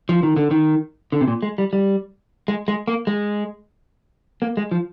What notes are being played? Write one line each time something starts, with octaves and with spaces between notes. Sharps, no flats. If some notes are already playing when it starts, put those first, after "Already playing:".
F3
D#3
D3
D#3
D3
C3
A#2
G#3
G3
G3
G#3
G#3
A#3
G#3
A#3
G#3
F3